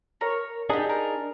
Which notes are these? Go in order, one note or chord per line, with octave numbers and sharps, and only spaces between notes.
A#4 C#5
D4 D#4 G4 G#4 F#5
A#4